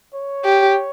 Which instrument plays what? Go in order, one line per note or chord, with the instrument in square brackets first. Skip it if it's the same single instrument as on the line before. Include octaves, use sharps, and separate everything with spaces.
[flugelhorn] C#5
[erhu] G4